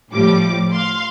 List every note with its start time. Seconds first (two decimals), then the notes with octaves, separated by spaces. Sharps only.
0.12 A2 F3 G3 D6
0.72 F5 C6